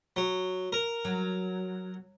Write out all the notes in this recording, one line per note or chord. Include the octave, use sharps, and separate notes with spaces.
F#3
A#4
F#3